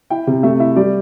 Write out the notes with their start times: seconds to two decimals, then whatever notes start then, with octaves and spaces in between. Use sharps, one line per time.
0.10 E4 G5
0.27 C3
0.43 A3 E5
0.60 E4 E5
0.76 G3 D5